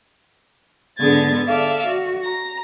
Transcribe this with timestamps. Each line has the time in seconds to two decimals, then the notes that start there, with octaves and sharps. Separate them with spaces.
0.98 G#2 D3 B3 G#4 G#6 A6
1.46 A4 D5 E5 F5
1.85 F#4
2.23 A#5 A#6